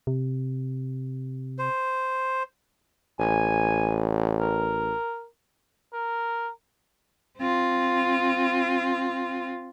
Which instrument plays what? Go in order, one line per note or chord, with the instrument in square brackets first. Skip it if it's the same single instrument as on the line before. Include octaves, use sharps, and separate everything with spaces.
[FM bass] C3
[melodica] C5
[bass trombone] A1 [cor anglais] G#5
[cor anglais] A#4
[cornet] A#4
[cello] C4 F4